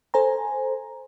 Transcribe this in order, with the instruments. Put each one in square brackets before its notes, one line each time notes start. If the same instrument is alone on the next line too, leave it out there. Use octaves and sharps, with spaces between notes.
[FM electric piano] A4 C5 G#5 A#5